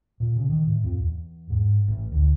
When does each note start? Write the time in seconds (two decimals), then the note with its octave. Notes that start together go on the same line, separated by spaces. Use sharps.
0.20 A#2
0.36 C#3
0.50 D#3
0.66 A2
0.84 F2
1.01 E2
1.50 G#2
1.88 A1
2.12 D2